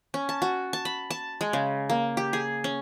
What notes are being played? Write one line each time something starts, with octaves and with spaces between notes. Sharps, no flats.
C#4
A5
F#4
A5
B5
A5
G#3
C#3
A#3
G4
G#4
C#4